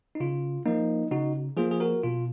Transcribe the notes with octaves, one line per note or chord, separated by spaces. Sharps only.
D#4
C#3 F4
F3 A#3 D#4
C#3 D#4 F#4
F3 A#3 F4 G#4
G#4
F#4 A#4
B2 F4